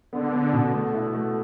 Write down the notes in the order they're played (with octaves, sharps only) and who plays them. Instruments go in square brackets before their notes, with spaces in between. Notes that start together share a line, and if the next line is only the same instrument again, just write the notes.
[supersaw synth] D3 [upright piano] B3
[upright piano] B3
B2
A3
E4
A3